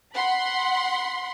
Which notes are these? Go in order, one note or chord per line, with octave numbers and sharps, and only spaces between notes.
F#5 B5 C6